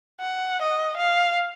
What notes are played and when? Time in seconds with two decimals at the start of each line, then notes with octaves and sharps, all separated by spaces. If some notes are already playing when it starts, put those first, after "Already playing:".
0.20 F#5
0.62 D#5
0.97 F5